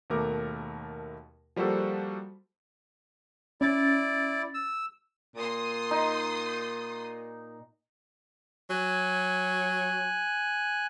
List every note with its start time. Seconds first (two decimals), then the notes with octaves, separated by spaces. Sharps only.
0.10 D#2 B2 A3 A#4 D6
1.56 F3 G3 A#3 F#4 A4 C5
3.61 C#4 E4 D5 A6
4.54 E6
5.36 A#2 C6 D#6
5.91 D#4
8.70 F#3 G#5 F#6